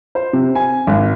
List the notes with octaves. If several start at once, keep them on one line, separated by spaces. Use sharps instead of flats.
C5
C3
G#5
G#1